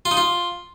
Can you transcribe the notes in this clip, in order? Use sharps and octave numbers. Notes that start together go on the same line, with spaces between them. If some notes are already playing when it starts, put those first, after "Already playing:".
F4
D#4
F4